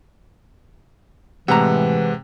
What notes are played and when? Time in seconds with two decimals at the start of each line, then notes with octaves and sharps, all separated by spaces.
1.48 A2 C3 E3 G#3 C4 G#4 F#5 A#5